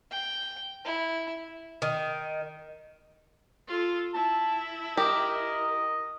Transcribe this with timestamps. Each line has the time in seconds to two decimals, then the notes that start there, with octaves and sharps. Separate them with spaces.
0.11 G5
0.85 E4
1.82 D#3
3.67 F4 A4
4.14 E4 A5
4.97 G4 A#4 D#5